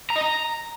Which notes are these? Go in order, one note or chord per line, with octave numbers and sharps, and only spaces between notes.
A#5
D#5
A#5